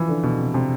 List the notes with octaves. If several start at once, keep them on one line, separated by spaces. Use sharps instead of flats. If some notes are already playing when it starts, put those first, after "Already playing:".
Already playing: E3 F3
D3
B2
C3
C3